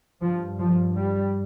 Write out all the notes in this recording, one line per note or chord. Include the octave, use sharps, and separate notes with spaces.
G2 F3
F3
G3